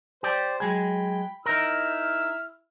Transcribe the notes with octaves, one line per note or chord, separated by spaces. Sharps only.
G4 C5 D5
F#3 G#3 G#4 G5 B5
D#4 E4 A#4 E6 F6